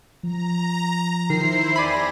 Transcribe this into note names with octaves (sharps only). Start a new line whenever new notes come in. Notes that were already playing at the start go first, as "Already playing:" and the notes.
F3 A#5
D#3 E4 C5 C7
E2 G4 D5 G#5 B5 A#6